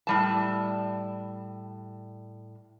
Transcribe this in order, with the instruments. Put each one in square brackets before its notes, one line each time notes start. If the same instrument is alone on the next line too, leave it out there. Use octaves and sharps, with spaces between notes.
[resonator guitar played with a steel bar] A2 G3 A5